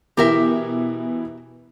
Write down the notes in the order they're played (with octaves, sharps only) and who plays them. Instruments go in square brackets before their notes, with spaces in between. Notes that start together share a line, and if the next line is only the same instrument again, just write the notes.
[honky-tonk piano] B2 E3 E4 [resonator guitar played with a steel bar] G4 A#4 E5